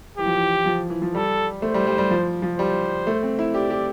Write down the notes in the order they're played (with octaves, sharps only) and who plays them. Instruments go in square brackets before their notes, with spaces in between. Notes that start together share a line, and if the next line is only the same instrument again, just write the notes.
[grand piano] E3 [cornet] G4
[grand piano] F3
E3
F3
E3
F3
[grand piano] G3 [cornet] A4
[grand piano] A3 [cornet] C5
[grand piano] G3
G3
G3
F3
F3
[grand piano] G3 [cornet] C5
[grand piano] A3
C4
E4
[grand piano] G4 [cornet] D5
[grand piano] G4